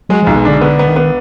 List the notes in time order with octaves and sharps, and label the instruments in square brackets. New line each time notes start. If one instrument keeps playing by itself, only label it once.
[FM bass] F#3 [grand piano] G#3
[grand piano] B1 [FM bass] F3
[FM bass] B2
[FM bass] D3 [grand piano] D4
[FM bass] D3 [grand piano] B3
[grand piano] B3
[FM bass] D#3
[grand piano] B3